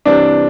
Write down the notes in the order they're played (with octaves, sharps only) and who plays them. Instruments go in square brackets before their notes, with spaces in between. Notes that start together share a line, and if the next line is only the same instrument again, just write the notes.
[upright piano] C3 E3 G3 C4 G4 [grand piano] D4